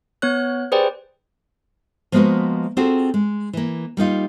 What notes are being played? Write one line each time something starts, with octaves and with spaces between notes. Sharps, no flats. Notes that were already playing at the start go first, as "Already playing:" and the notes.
B3 C#5 F#6
G4 G#4 B4 C5 D5 G5
F3 G#3 A#3 B3 F#4 B4
C4 F4 F#4 G#4 A4
G#3
E3 A#3
G3 A#3 D#4 F4